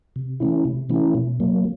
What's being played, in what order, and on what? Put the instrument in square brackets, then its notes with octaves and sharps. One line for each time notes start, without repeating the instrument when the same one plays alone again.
[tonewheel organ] C3
E3 A3 C#4 E4
C3
E3 A3 C#4 E4
B2
F#3 A#3